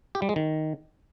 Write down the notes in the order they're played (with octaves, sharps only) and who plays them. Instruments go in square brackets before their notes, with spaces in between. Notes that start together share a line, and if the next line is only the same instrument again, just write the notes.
[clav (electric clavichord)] G4
G3
G#3
D#3